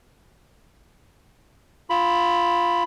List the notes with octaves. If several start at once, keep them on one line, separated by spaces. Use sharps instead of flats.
F4 B5